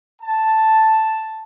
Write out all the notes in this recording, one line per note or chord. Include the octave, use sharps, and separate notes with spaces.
A5